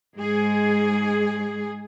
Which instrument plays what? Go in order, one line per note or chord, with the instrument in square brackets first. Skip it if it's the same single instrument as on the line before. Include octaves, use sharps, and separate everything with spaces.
[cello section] G#2 G#3 G#4